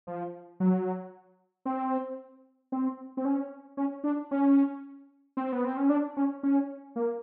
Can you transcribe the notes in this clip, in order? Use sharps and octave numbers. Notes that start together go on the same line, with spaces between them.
F3
F#3
C4
C4
C4
C#4
C#4
D4
C#4
C4
B3
C4
C#4
D4
C#4
C#4
A#3